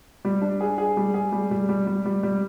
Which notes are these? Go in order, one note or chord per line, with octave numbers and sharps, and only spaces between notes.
G3
D4
G#4
G#4
G3
G#4
G3
G3
G3
G3
G3
G3